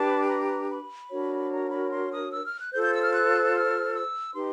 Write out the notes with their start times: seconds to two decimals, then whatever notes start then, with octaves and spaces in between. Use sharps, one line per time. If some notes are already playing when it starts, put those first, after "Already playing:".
Already playing: D4 G4 B4 A5
0.29 A#5
0.70 B5
1.10 D4 F#4 A#4 C#5
1.52 A#5
1.71 B5
1.91 C6
2.12 D#6
2.33 E6
2.45 F6
2.59 F#6
2.72 F4 A4 C5 G6
2.82 G6
2.93 E6
3.03 F6
3.13 F#6
3.54 F6
3.94 E6
4.34 D#4 G4 B4 C6